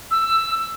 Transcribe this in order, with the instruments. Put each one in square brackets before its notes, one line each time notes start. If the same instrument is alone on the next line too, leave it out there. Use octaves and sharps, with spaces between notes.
[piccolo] E6